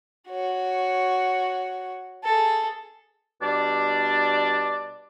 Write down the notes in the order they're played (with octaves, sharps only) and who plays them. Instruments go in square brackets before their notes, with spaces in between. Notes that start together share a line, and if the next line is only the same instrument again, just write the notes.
[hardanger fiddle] F#4 C#5
G#4 A4
[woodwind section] B2 G3 D4 D5